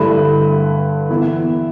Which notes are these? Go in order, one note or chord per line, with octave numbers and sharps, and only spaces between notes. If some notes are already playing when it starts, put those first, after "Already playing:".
Already playing: G2 D3 A3 E4 B4
E3 B3 E4